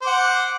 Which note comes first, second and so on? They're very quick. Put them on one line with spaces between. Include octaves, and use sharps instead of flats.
C5 D6 F#5